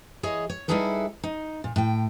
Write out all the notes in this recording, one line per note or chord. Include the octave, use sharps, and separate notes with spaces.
E3 G#4 C#5 D#5
C#5
G3 D#4 E4 G#4 A4 B4
D#4
A#2
A2 G5